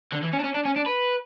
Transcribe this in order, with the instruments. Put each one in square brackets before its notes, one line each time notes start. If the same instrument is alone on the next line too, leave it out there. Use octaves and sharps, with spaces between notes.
[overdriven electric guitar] D3
E3
C#4
D4
C#4
D4
C#4
D4
B4